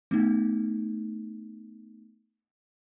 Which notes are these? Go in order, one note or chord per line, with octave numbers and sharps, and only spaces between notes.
A3 B3 D#4